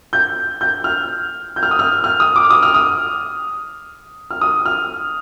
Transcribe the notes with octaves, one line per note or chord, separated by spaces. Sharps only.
G6
G6
F6
G6
F6
D#6
F6
F6
D#6
D6
D#6
F6
D#6
F6
D#6
F6